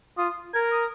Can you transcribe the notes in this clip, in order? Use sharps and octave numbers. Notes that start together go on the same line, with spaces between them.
F4 D#6
A#4 G#6
D#6